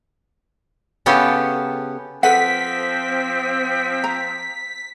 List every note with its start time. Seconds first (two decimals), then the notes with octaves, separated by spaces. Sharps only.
1.06 C#3 B3 C#4 G4 A4
2.23 F3 C4 A4 B4 F#5 B6
4.04 A#5